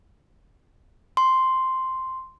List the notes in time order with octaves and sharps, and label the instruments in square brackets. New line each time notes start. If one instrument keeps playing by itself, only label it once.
[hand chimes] C6